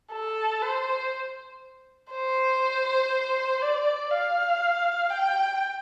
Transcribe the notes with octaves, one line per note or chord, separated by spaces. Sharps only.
A4
C5
C5
D5
F5
G5